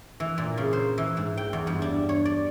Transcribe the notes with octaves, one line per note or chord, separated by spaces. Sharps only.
E3
A#2
C#3
C5
E3
G#2
G5
E2
G2
D4
C#5
D5